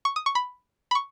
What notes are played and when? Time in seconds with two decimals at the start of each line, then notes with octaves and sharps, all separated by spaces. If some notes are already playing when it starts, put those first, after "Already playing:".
0.05 C#6
0.16 D#6
0.26 C#6
0.35 B5
0.91 B5
0.95 C#6